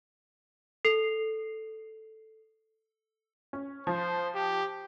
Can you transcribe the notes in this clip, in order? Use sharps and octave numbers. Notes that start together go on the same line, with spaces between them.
A4 C7 F7
C#4
F3 C5
G4